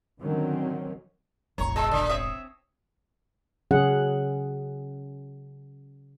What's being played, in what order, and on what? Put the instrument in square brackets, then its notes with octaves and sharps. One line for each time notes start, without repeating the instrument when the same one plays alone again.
[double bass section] D3 D#3 F#3 C4 C#4
[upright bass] E1 A1 [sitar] C#5 [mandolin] A#5 C#6
[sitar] G#3 [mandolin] D#5 A5 E6
[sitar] D3
[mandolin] C4 C#5 D#6 [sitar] E5
[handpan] C#3 F#3 C#4 G#4 F#5